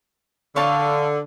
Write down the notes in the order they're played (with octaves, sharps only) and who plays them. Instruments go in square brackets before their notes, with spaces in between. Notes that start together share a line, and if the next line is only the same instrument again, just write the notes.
[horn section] D3 [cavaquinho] C#5 F5 A5